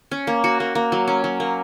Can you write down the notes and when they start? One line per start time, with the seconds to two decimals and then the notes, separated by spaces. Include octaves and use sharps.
0.12 C#4
0.27 A#3
0.44 F#4
0.60 A#3
0.75 A#3
0.92 F#3
1.08 C#4
1.24 F#3
1.40 A#3